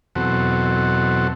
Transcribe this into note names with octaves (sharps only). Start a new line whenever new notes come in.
E2 B2 F#3 C4 F#4 A4